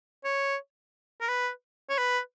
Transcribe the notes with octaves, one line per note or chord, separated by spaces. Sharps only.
C#5
A#4
B4
C#5
B4